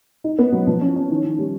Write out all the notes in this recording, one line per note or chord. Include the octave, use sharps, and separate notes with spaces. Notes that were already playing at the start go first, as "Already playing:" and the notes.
D#4
B3
F#3
F3
C#4
C#4
D#3
D#3
G3